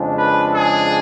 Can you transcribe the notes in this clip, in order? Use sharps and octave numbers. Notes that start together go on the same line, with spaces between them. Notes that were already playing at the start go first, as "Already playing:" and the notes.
Already playing: F2 C#3 G#3 D4
B4
G#4